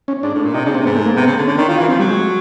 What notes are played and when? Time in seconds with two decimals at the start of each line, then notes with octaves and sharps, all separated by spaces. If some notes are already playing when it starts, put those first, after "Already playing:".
0.08 C#4
0.23 G#2 D4
0.34 A2
0.45 A#2
0.54 C3 D#4
0.65 C#3 D4
0.75 C3 C4
0.85 G#2 B3
0.96 A3
1.06 A#3
1.16 C3 B3
1.27 C#3
1.37 D3
1.47 D3 C#4
1.58 D#3 D4
1.68 D#3 F4
1.78 E3 F4
1.89 F3 C4
1.99 F#3 G3
2.10 G#3